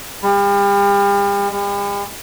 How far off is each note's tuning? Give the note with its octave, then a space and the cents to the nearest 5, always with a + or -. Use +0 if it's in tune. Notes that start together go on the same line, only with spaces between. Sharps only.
G3 +40
G3 +45